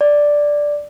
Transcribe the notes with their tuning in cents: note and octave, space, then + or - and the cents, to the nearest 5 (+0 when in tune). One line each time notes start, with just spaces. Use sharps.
D5 +0